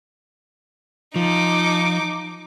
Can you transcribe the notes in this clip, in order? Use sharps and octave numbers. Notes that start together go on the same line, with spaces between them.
F3 D#4 D6